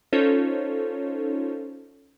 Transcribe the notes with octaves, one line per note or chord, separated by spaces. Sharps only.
C#4 D#4 F4 A4 C5 C#5